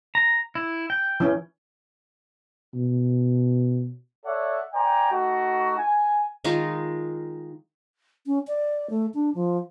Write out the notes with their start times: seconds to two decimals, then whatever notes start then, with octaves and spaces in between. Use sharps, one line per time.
0.15 A#5
0.55 E4
0.90 G5
1.20 E3 C#4
2.74 B2
4.25 A4 C#5 D5 E5 F#5
4.74 C5 D5 G5 G#5 A#5
5.11 A3 D#4 F#4
5.78 G#5
6.44 D#3 G#3 D#4 F4
8.26 C#4
8.47 D5
8.90 A3
9.14 D4
9.35 F3